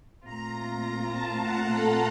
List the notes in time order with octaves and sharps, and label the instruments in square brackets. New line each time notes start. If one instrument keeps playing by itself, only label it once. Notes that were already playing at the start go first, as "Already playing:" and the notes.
[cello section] A#2 A3 C4 F4 [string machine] A#5
[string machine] A5
F#5
A4